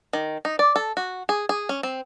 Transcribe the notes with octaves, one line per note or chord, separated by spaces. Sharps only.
D#3
D#4
D5
A4
F#4
G#4
G#4
C#4
C4